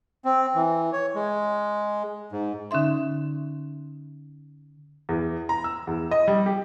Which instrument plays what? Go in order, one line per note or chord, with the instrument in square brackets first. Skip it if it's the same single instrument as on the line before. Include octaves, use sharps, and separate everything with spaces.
[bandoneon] C4
E3
C#5
G#3
G#2
[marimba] D3 C#4 D#4 E5 C6
[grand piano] E2
A#5
E6
E2
D#5
G3
G4